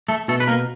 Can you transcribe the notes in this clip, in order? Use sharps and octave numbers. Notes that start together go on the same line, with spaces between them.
A3 A4
B2 A3 A4
B4
A#3 A#4